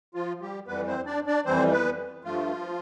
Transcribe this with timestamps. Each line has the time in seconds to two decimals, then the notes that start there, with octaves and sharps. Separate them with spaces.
0.15 F3 F4
0.41 G3 G4
0.67 F2 E3 G3 B3 B4
0.87 C4 C5
1.06 D4 D5
1.26 D4 D5
1.45 F2 E3 G3 C4 C5
1.72 B3 B4
2.25 G2 F3 A3 F4